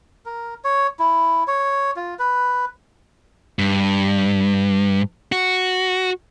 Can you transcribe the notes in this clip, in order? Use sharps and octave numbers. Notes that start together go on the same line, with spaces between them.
A#4
C#5
E4
C#5
F4
B4
G2
F#4